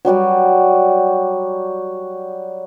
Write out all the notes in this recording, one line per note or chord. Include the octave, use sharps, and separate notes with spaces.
F#3 G3 F#4 D5